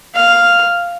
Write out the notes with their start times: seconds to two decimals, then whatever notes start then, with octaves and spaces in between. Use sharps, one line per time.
0.14 F5